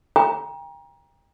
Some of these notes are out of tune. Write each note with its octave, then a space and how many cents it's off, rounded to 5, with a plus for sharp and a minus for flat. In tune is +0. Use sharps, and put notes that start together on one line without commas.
G5 +30 A#5 +25